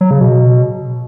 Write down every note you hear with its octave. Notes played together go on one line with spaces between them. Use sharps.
F#3
C#3
B2